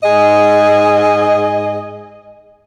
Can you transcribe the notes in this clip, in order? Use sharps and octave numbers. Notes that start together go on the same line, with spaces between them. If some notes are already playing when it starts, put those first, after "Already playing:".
G#2 G#4 D#5